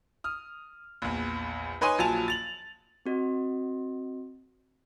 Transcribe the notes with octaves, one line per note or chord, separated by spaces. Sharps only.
D#6 F6
A#1 E2
D#4 B4 C#5 G#5 C6 D#6
A#1 F3 F#3 G#5 A5 F7
A6 F7 F#7
C4 F#4 D#5